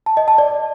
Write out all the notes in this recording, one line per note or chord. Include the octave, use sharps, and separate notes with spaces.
A5
D#5
A5
D5